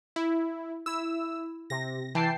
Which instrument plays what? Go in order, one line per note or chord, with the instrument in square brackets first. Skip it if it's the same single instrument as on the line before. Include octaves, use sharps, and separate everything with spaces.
[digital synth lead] E4
[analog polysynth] E4 [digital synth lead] E6
[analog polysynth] C3 [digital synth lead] A#6
[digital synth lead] E3 [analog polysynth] G5 A5 C7